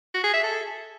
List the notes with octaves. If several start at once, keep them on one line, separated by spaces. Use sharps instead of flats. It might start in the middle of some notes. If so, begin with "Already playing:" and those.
F#4
G#4
E5
A4